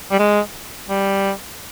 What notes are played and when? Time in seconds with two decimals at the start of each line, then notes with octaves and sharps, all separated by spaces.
0.11 G3
0.19 G#3
0.89 G3